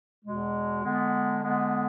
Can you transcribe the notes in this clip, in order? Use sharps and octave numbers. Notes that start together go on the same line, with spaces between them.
E2 B2 G#3
D3 G#3 B3
D3 G#3 B3